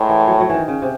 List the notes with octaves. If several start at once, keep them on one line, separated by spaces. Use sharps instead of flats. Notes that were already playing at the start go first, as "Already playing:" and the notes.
Already playing: A2 G#3
E3
F#3
F#3
D#3 E3
C#3
C3